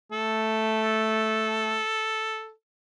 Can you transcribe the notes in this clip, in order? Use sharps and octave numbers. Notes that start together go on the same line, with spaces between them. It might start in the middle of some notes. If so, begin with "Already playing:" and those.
A3 A4